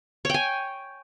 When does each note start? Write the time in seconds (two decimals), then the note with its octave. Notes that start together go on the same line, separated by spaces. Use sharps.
0.25 C#5
0.29 G5
0.34 G#5